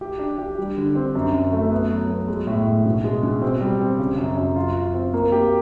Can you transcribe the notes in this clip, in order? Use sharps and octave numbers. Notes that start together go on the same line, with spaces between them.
G4
D4
G4
G3
D3
C4
F#2
F#2
A3
B3
F#3
B3
G#3
A2
A2
B2
G#3
B2
C4
G3
C4
C#3
F#2
F#2
F4
F4
C4
A#3
G4